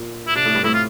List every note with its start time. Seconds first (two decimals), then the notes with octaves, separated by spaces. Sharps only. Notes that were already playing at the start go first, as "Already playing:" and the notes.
Already playing: A#2
0.27 E4
0.36 C3 D4
0.45 A2
0.55 G2
0.64 A2 E4
0.74 F4